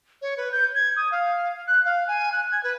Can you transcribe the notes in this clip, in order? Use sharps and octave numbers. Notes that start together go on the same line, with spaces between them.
C#5
B4
G6
G#6
D#6
F5
F#6
F5
G#5
F#6
G#6
B4